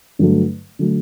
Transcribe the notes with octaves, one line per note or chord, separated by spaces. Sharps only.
G2 D3 F#3 A3
D3 F#3 A3